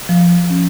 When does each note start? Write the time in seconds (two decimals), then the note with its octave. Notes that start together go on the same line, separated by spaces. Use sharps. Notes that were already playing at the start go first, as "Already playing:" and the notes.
0.09 F3
0.50 C#4